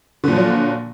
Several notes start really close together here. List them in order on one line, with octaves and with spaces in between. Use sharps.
D3 A#2 F3 F#3